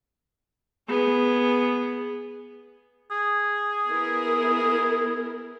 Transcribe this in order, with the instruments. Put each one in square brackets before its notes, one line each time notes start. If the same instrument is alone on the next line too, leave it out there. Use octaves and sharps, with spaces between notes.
[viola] B3 G#4
[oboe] G#4
[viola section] B3 E4 A#4